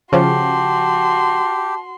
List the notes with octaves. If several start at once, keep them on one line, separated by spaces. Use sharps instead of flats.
C#3 F3 F#4 G4 A5 C6